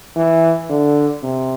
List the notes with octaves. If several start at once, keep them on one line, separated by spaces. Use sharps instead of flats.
E3
D3
C3